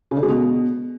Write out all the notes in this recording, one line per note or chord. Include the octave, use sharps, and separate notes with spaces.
C#3
D3
G#3
B2